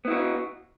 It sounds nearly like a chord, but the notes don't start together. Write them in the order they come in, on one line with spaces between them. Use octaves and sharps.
B3 E4 F#4